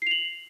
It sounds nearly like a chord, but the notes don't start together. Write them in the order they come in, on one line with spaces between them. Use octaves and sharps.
C7 F7 F#7